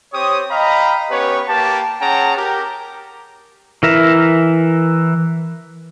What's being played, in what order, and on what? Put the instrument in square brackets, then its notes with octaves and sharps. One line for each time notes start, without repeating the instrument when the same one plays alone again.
[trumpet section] C4 G4 C#5 D#6
D#5 F5 G5 A#5 B5
B3 C#4 G4 B4 C#5
A#3 G4 B4 A5
C#4 G#4 F#5 G5 A5 A#5
G4 A#4
[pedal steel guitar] E3 A#4 E5